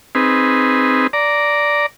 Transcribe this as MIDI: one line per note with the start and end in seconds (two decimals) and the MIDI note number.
0.15 1.07 60
0.15 1.07 63
0.15 1.07 68
0.15 1.07 71
1.13 1.86 74
1.13 1.86 82